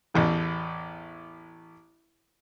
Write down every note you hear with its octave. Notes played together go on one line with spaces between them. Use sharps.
A1 E2 A2